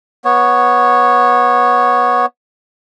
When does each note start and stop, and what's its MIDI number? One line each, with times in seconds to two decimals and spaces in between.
0.25 2.26 59
0.25 2.26 73